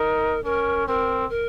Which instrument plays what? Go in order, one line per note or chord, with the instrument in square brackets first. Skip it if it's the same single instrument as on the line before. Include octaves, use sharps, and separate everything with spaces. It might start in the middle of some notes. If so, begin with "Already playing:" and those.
Already playing: [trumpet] D#4 [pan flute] A#4
[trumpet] C#4 [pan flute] A#4
[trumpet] C4 [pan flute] A#4
[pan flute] A#4